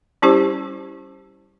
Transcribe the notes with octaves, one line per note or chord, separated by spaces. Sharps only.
G3 C#4 E4 G4 C5